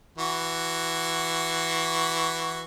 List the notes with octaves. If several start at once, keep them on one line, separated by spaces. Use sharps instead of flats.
E3 F#4